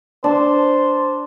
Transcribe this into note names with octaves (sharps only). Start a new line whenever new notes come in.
D4 C5